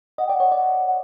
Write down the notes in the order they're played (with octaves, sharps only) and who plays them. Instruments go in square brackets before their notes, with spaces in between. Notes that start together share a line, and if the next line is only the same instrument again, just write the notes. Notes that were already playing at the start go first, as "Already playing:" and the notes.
[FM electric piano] D#5 [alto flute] F#5
[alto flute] G5
[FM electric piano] D5 [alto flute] F#5
[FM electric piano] C#5
[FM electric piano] D5 [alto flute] F#5
[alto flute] F#5